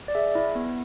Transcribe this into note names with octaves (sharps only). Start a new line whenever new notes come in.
D5
G#4 E5
E4
B3